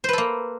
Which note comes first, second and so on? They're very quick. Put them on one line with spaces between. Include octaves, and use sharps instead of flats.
C5 B4 A4 A#3